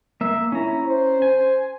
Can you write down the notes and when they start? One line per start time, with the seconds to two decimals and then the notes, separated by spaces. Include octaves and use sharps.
0.21 A#3 E5
0.52 C#4 E4 A#5
0.86 C5
1.22 G#5